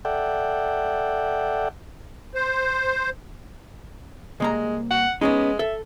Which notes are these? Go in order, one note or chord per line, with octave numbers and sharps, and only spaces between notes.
A4 D5 E5 F#5 G5
C5
C2 G#3 A#3 A#5
F#5
G#3 B3 C#4 D#4
A4 E5